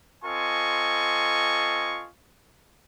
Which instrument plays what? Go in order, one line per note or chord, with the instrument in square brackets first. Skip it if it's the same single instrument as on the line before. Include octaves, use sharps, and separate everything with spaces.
[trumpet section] C4 F4 A4 D#5 G#5 C#6